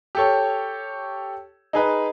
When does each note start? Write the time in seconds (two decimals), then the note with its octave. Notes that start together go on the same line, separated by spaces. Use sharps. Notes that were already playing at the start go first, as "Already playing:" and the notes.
0.15 G4 A4 C#5
1.73 D#4 G#4 B4